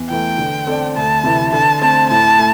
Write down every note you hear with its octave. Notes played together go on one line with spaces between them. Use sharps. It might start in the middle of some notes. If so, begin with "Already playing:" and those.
Already playing: E2
E3 A3 G5
D3
C4 A4 D5
D2 A5
C3 E3 A3 E4
D3 A5
A3 C4 A5
A2 A5
A3